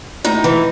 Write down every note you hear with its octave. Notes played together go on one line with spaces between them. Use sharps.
A2 D#4
E3